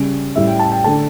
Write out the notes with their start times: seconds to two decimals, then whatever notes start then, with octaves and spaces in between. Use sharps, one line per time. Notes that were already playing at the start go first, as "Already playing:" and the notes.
Already playing: C#3 G3 C#4
0.36 A2 G3 C#4 E5
0.47 G5
0.59 A5
0.72 G5
0.84 D3 A3 D4 A5